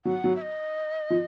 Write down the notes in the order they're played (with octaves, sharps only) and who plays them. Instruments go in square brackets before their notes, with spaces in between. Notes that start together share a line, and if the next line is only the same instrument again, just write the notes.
[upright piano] F#3 [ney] F#5
[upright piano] F#3
[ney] E5
D#5
[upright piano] F3